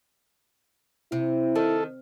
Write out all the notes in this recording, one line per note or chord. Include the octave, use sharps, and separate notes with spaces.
C3 E4
D#3 A4